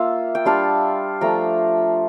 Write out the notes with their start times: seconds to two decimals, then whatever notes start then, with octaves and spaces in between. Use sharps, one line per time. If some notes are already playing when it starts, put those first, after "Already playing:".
Already playing: A#3 F4 E5
0.35 G5
0.45 G3 D4 F4 F5 A5
1.21 F3 A3 D4 G5 A#5